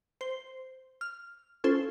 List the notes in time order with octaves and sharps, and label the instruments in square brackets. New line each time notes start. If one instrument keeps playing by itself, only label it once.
[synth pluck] C5
F6
C#4 F4 A4 C5